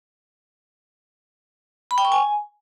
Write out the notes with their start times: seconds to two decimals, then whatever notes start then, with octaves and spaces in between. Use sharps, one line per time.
1.91 B5
1.98 G5
2.05 C#6
2.12 G#5